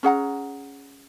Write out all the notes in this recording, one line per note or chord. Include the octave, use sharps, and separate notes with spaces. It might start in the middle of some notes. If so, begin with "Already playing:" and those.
C#4 G#4 F#5 A#5